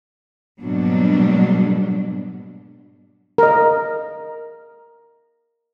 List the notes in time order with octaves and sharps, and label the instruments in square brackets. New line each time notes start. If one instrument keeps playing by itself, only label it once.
[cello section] G#2 B2 F#3 G3 A#3 D4
[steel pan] A#4 D#5